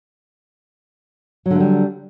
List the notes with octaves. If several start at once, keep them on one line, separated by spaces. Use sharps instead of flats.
D3 F#3 G3 A3